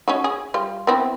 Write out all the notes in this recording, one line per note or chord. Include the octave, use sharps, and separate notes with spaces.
C#4 D#4 F#4
G#4
G3 F4
B3 C4 E4